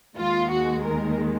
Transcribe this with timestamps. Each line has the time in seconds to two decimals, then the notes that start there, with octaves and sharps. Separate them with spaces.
0.17 D#2 D#3 G#3 F4
0.50 F#4
0.83 A#4